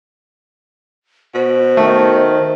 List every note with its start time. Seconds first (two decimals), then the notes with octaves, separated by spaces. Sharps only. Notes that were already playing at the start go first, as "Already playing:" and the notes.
1.35 B2 C5
1.77 D#3 A3